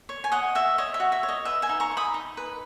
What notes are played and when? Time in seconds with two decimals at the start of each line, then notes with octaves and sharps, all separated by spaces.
0.09 C#5
0.24 G#5
0.32 C#5 D#5 F#5
0.55 F#4 E5
0.78 C#5 D#5
0.94 E5
1.00 F#4
1.12 E5
1.23 C#5
1.28 D#5
1.45 B4 E5
1.62 E5 G#5
1.69 D#4
1.80 A#5 C#6
1.91 D#4
1.97 B5 D#6
2.14 D#4
2.37 B4